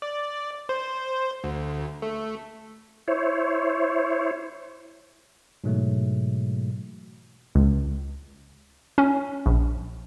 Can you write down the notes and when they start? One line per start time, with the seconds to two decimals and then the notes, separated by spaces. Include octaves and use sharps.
0.02 D5
0.69 C5
1.44 D2
2.02 A3
3.08 E4 C5 C#5
5.64 G#2 B2 E3 F#3 G#3 A3
7.55 C#2
8.98 C#4
9.46 A#1